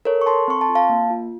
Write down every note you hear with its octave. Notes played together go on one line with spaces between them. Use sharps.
A4 A#4 C#5
C#6
A4 A5 C6
C4 C#6
A5 C6
F4
F5 A5
A#3
F4